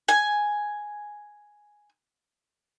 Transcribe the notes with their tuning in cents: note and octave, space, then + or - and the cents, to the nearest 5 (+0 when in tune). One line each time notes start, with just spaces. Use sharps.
G#5 +0